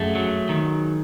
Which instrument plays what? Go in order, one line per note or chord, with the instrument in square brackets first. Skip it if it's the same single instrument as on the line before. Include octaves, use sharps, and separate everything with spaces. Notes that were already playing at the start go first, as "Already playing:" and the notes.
Already playing: [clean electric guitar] F#2 A3 [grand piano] G#4
[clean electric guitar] F#3
D#3